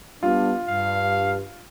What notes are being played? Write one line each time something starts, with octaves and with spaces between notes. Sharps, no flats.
G3 B3 D4 F4
G2 F5